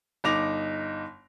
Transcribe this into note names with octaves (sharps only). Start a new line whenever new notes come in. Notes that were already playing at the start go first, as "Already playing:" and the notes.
G1 D#4 D6 A#6 F7